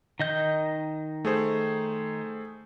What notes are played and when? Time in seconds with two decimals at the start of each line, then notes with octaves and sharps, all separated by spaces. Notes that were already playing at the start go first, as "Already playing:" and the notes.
0.20 D#3 D#5 G6
1.25 A3 G#4 C5